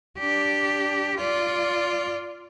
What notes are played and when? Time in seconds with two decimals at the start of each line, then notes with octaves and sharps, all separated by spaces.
0.18 D4 G4
1.17 F4 D5